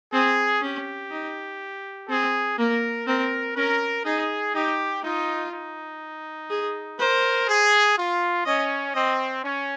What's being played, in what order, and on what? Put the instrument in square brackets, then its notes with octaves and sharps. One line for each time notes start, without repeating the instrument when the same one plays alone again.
[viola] C4 [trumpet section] G#4
[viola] C#4 [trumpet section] G4
[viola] D#4
[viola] C4 [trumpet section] G#4
[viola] A#3 [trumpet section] A#4
[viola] C4 [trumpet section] A#4
[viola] C#4 [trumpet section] A#4
[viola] D#4 [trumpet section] G#4
[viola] D#4 [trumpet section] G4
[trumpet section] D#4 [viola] F4
[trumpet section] D#4
[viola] G#4
[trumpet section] A#4 [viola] C5
[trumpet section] G#4
F4
[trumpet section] C#4 [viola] D#5
[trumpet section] C4 [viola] D#5
[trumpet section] C#4